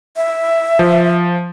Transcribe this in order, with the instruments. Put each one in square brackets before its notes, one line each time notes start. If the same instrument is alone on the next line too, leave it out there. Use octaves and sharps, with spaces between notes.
[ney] E5
[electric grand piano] F3